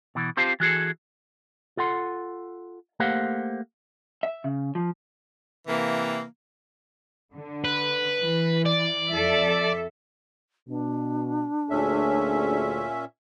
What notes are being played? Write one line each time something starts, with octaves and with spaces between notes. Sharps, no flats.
B2 E3
C4 F4 G4 C5 F5 A5
E3 F#4 G#4 A4
F4 A4 F#5 C6
A3 A#3 G4 C5 F5 F#5
E5
C#3
F3
C3 E3 A#3
D3
B4
E3
D5
F2 A4 E5
B2 D4
D2 A#2 C#4 G#4 C#5 E5